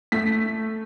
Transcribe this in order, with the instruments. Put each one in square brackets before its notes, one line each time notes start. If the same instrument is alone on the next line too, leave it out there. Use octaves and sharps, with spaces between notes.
[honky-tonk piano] A3 B6